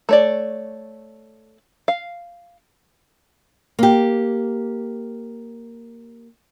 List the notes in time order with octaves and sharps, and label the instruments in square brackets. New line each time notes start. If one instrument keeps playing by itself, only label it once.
[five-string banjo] A3 C#5 D5
F5
[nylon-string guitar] A#3 G4